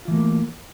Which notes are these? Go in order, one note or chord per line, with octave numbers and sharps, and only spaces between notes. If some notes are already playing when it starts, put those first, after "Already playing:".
E3 A3 A#3 F4